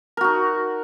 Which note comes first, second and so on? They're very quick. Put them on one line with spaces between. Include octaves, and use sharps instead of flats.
A#4 F#4 D#4